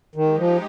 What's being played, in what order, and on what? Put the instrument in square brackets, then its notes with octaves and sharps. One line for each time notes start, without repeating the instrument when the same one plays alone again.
[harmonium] D#3 [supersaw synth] G#3 D#4 G4
[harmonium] F3